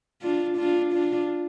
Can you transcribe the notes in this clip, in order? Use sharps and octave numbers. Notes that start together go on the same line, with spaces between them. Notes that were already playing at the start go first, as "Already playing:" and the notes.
D4 F4
D4 F4
D4 F4